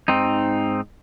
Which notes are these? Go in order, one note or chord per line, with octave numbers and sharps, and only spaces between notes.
G#2 C4 D#4